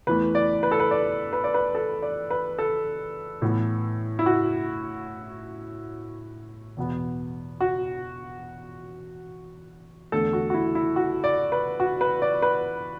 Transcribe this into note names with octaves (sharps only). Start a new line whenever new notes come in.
E2 E3 A3 B4
D5
B4
A4
B4
D5
B4
D5
B4
A4
D5
B4
A4
A2 E3 B3
E4
F#4
E2 B2 B3
F#4
E2 D3 A3 A4
F#4
F#4
E4
E4
F#4
D5
B4
F#4
B4
D5
B4